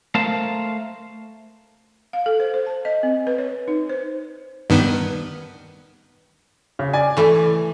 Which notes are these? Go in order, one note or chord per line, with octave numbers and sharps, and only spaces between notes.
A3 A#4 C5 F5 A5
F5
A4
C5
C5
A5
D#5
C4
B4
C#5
D#4
C5
G2 D#3 B3
C#3
D5 G#5
E3 A3